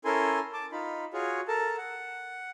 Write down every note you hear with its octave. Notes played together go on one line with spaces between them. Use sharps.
C#4 E4 A4 A#4 G#5 C6
A5 D6
D#4 F4 B5
F4 F#4 G#4 C#5
A4 A#4 A5
F#5